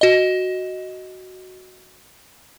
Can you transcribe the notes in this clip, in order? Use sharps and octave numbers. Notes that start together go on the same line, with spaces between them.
F#4 D#5